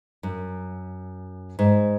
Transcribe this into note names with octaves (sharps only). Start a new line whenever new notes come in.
F#2
G#2